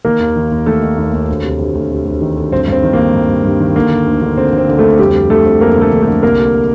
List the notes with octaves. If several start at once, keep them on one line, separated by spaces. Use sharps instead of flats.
D#3 A#3 A#4
D#2
D#3
D#2
D#3 A3 A4
D#3
D#2
D#2
D2
C3
D2
D2
C3
D2
D#3
D2
G2 C4
G2 C4
D#3
A#3
D#3
G2
G2
G2
D#3
D3 A#3
D3
D2
D3
D3 C4
D3
C4
D3
A3 A4
D2
F2 G3 G4
F2
D3 A3 A4
F2
F2 A#3 A#4
D3 A3 A4
D3
A3 A4
D3
C2 A#3 A#4
C3